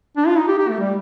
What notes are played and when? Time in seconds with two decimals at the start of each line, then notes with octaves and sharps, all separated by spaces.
0.17 D4
0.27 F4
0.38 D#4
0.48 G4
0.58 G4
0.69 A3
0.80 G3